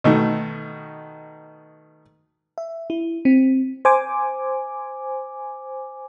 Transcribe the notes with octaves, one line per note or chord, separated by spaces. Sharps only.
B2 D#3 A3
E5
E4
C4
C5 G#5 D6